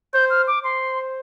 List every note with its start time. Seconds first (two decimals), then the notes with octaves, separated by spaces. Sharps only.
0.14 C5 G6
0.30 F6
0.47 D6
0.63 C5 C6